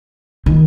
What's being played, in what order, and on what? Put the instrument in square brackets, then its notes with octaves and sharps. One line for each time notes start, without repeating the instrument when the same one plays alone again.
[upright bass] D#3